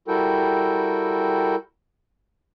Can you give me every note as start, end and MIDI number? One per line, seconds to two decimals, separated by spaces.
0.08 1.56 55
0.08 1.56 64
0.08 1.56 66
0.08 1.56 69
0.08 1.56 70
0.08 1.56 79